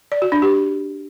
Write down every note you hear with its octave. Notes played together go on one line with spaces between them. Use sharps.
D5
F#4
D4
G4